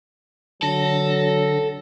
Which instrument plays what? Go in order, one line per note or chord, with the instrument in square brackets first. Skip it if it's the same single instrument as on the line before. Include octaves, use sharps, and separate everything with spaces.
[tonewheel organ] D3 A#6 [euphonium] F#3 [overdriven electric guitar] A4